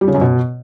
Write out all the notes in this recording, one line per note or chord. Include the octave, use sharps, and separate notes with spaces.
G3
C#3
F#2
B2